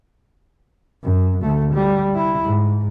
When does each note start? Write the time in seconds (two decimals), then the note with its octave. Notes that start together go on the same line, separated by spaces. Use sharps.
1.03 F#2
1.42 D2 A3
1.73 G3
2.15 E4
2.43 G#2